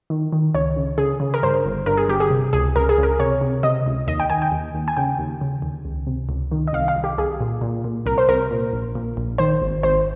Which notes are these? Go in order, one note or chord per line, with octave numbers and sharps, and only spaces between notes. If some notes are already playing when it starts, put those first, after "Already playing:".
D#3
D#3
C#2 C#5
C#3
C#3 G#4
C#3
A#4
G2 C5
G1
G2 A#4
G#4
G1 G4
G#4
C3
C#2 G#4
C#2 A#4
G#4
C#2
A#4
C3 C#5
C3
C3 D#5
C#2
D#2 D#5
G5
D#3 G#5
G5
D#2
D#2
G#5
C#3 G5
D#2
C#3
D#2
C#2
C3
C#2
D#3
D#5
C2 F5
F5
C2
G4
C2 G#4
A#2
A#2
A#2
C2 A#4
C5
C2 A#4
A#2
A#1
A#2
A#1
D#3 C5
G#1
G#1 C5